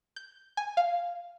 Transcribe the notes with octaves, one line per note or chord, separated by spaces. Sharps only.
G6
G#5
F5